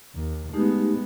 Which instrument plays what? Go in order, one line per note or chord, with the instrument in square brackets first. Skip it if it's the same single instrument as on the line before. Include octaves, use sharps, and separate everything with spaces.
[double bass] D#2
[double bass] G#3 B3 [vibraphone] A3 D#4 G4